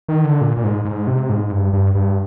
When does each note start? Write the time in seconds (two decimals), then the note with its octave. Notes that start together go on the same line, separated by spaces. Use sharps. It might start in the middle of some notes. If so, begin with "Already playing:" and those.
0.09 D#3
0.25 D3
0.41 A#2
0.57 A#2
0.64 G#2
0.85 G#2
1.07 C3
1.29 G#2
1.51 G2
1.73 G2
1.95 G2